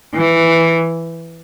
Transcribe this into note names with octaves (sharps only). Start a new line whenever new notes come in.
E3